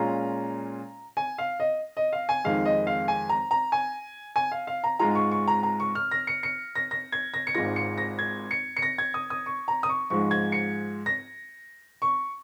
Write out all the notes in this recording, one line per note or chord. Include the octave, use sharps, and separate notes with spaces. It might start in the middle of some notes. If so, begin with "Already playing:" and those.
Already playing: A#2 G#3 C#4 F4 A#5
G#5
F5
D#5
D#5
F5
G#5
F2 D#3 G#3 F5
D#5
F5
G#5
A#5
A#5
G#5
G#5
F5
F5
A#5
G#2 G#3 F4 A#5
C#6
C#6
A#5
A#5
C#6
F6
A#6
C#7
C#7
A#6
A#6
G#6
A#6
C#7
G#1 G#2 G#3 F4 A#6
C#7
A#6
G#6
C#7
C#7
A#6
G#6
D#6
D#6
C#6
A#5
D#6
C#6
G#2 F3 G#3 C#6
G#6
C#7
A#6
C#6